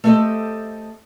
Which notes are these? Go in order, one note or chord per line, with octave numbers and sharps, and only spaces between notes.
A3 B3 C4 G4 A4 D#5